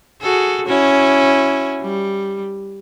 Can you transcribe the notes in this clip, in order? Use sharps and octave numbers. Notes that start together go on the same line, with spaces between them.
F#4 G#4 A4
C#4 E4 F#4
G3